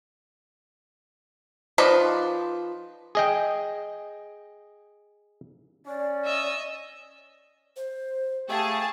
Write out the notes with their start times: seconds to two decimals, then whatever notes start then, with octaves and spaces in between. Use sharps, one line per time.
1.78 F3 D#4 B4 D5
3.15 G#4 D#5 G5
5.86 C#4 D5
6.25 D#5 E5 E6
7.76 C5
8.50 A3 G4 G#4 F5 G5 A5